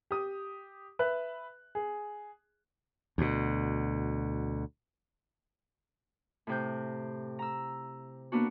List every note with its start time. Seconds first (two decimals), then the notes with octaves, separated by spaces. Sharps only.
0.11 G4 D#6
0.99 B4 E5 F#6
1.75 G#4
3.18 D2 B2
6.47 A2 C3 G6
7.39 A#5 E6
8.32 A#3 B3 D4 F#4